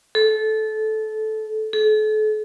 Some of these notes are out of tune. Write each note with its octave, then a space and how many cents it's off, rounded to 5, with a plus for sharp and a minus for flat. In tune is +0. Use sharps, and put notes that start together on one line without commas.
A4 -20
A4 -40